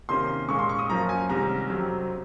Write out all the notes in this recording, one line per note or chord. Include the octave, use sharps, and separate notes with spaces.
C3 D#3 A#3 C#4 C6
A#2 G#3 C#4 C#6
C6
C#6
D#6
F#2 F3 A#3 C#4 A#5
G#5
C2 C3 D#3 G#3 C#4 A#5
F2 C3 F#3 C4